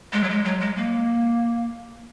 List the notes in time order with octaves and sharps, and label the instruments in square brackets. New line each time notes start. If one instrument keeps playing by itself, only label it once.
[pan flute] G#3
F#3
G#3
F#3
G#3
A#3